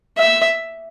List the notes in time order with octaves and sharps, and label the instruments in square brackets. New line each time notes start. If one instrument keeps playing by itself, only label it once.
[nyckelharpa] E5